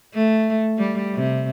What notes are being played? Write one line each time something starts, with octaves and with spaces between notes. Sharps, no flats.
A3
G3
C3